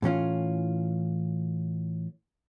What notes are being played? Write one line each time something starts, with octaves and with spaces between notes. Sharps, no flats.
A2 E3 C#4 F4